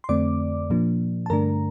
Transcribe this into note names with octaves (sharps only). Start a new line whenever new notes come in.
C6
F2 D3 A3 C4 D5 D6
A#2 F3 A#3 D4
A5
G2 D3 A3 D4 A#4 A#5